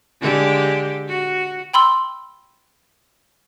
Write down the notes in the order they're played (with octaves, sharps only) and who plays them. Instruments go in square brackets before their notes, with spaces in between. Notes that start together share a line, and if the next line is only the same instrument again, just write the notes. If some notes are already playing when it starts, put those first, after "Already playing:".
[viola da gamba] D3 G#3 G4
F#4
[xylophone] G5 B5 C6 E6